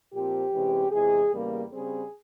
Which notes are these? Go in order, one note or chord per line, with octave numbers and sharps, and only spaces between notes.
A#2 F3 C4 G4
C3 E3 G#3 C#4
E2 C3 E3 G#3 G#4
E2 C#3 G3 A#3
C#3 G3 C4 G#4